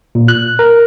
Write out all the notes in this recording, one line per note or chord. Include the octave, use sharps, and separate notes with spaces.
A#2
F#6
A#4